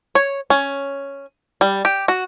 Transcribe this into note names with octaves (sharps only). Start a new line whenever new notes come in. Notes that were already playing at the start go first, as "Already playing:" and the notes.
C#5
C#4
G3
G4
F#4